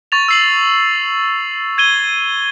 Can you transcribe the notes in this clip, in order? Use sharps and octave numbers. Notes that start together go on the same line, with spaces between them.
C#6 A6 F7
E6 C7 F#7
G#6 D#7 G7